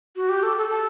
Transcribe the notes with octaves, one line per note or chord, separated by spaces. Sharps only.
F#4
G4
A4
A4
A4